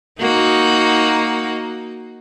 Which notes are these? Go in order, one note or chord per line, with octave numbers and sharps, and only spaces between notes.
A#3 D#4 F#4